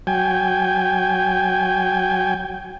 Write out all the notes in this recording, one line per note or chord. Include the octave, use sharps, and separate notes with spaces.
F#3 G5 G#5